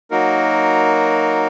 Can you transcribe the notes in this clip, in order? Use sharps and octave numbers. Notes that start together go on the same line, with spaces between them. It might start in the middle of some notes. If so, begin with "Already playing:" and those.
F#3 A#3 D#4 F#4 A#4